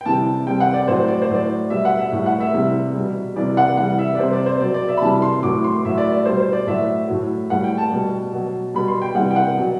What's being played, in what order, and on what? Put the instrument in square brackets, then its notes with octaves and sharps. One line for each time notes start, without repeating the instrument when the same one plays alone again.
[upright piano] G5
C3 E3 G3 A5
C3 G3 G5
F#5
D5
A2 F#3 C5
D5
C5
A2 F#3 D5
B2 G3 E5
F#5
E5
A2 G3
F#5
E5
C3 E3 G3
B2 G3
C3 E3 G3 D5
F#5
C3 E3 G3 F#5
E5
D5
C3 G3 C5
D5
C5
B2 F#3 D5
D5
E5
B5
C3 E3 G3 A5
C6
A2 F#3 D6
C6
A2 F#3 E5
D5
D5
B2 G3 C5
C5
D5
A2 F#3 E5
A2 F#3
A2 G3 F#5
G5
A5
B2 G3
B2 F#3
B2 G3 B5
C6
G5
C3 E3 G3 F#5
G5
F#5
B2 F#3